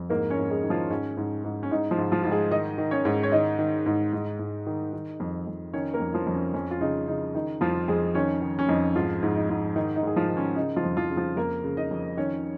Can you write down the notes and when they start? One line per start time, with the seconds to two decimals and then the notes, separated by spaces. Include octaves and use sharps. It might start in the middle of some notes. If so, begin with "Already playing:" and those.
Already playing: F2
0.10 G#2 A#3 A#4
0.30 C#4 C#5
0.37 G#2
0.50 G#3 G#4
0.64 D#3
0.70 F3 F4
0.90 G#2 C#4
1.17 G#2
1.44 G#2
1.63 C#4
1.71 G#2 D#4
1.91 F3 F4
1.98 G#2
2.12 F3 F4
2.23 G#2 F4
2.31 G#3 G#4
2.51 D#3 D#4 D#5
2.78 D#3
2.91 C#4 C#5
3.05 G#2
3.23 C#5
3.32 D#3 D#4 D#5
3.59 D#3
3.86 G#2
4.13 G#2
4.39 G#2
4.67 D#3
4.93 D#3
5.20 F2
5.47 F2
5.74 D#3 C#4 C#5
5.94 A#3 A#4
6.00 F2
6.14 F3 F4
6.27 F2
6.34 C#4
6.54 F2 C#4
6.71 F4
6.81 C#3 D#4
7.08 C#3 D#4
7.35 D#3 D#4
7.61 F2 F3 F4
7.88 F2 G#3 G#4
8.15 D#3 C#4 C#5
8.42 D#3
8.59 C#4
8.69 F2 D#4
8.96 G#2 F3 F4
9.23 G#2
9.36 D#4
9.49 G#2
9.76 D#3 D#4
9.96 D#4
10.03 G#2 G#4
10.16 F3 F4
10.30 D#3
10.37 C#4
10.56 C#3 D#4
10.76 F3 F4
10.84 F2
10.97 F3 F4
11.10 C#3
11.17 F3 F4
11.37 F2 A#3 A#4
11.64 C#3
11.77 D#4 D#5
11.91 F2
12.17 D#3 C#4 C#5